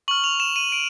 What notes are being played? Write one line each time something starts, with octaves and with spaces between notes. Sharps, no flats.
C#6 F6 F#7
F7
E7
D#7
D7